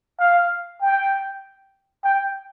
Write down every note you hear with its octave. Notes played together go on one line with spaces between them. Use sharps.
F5
G5
G5